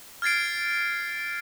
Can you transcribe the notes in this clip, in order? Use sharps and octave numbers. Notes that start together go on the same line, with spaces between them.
F6 G#6 A6 C7 D7